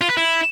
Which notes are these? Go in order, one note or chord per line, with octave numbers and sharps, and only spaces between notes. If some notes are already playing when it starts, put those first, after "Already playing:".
F4
B4
E4